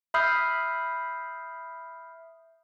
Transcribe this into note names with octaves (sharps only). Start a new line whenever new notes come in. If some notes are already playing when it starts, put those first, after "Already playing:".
E5 B5 D#6 F6 G6 C7